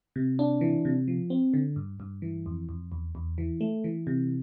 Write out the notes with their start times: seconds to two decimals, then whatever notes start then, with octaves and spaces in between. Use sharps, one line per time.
0.16 C3
0.39 D4
0.61 E3
0.85 C3
1.08 F3
1.30 C4
1.54 D3
1.76 G2
2.00 G2
2.22 E3
2.46 F2
2.69 F2
2.92 E2
3.15 E2
3.38 E3
3.61 A3
3.84 E3
4.07 C3